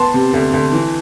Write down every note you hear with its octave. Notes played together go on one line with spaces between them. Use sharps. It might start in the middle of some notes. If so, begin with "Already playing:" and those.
Already playing: B3 A5 C6
C3
D2
D2
E3